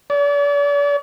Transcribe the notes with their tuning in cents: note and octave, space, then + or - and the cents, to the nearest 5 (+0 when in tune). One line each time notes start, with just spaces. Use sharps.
D5 -40